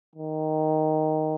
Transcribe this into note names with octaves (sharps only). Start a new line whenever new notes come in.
D#3